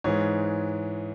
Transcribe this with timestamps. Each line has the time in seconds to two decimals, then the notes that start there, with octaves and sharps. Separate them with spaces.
0.04 G#2 E3 G#3 C#5